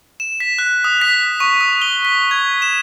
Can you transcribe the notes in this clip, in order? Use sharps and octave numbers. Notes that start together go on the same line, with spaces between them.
E7
B6
F#6
D#6
B6
C#6
D#6
G7
B6
G#6
E7